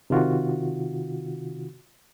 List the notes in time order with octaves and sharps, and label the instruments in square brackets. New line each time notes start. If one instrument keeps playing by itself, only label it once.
[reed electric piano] C3 D#3 F4 F#4